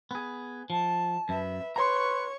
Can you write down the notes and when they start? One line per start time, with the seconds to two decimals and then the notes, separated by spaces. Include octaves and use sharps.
0.11 B3 G#4
0.70 F3 A5
1.29 F#2 B4 E5
1.76 B4 C#5 A#5 C6 C#6